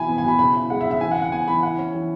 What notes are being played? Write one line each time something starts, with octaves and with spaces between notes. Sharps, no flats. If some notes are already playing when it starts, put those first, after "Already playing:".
Already playing: B2 E3 E4 G#5 B5
B3
B2 G#5
B5
C#3 B5
E4
G#3 F#5
E5
C#3
E5
E3 G#5
F#5
E4
F#5
B3 G#5
E3 B5
E4 F#5
C#4
E3